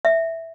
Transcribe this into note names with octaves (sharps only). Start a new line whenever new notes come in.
E5